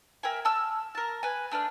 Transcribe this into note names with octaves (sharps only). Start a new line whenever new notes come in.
A#4 E5 G5 G#5
A5 E6 F6
A#4 A5
B4 G#5
A3 D4 B4 F6